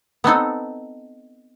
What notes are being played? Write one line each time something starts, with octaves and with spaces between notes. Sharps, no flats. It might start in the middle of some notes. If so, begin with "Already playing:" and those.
B3 C4 D#4 A4